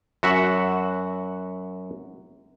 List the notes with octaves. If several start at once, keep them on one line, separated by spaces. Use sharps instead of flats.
F#2 F#4 E5 F#5